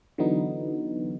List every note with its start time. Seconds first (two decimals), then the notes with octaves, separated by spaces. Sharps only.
0.18 D3 E3 F#3 B3 D#4